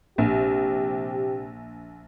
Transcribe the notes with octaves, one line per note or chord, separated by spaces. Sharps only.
A#1 C3 G4